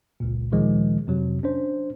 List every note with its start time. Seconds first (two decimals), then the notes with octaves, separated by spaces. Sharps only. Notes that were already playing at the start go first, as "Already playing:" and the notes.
0.20 G1 C#2 A#2
0.52 D2 A#2 D#3 F3 G#3
1.07 F2 C3 F#3
1.43 C#4 D4 C5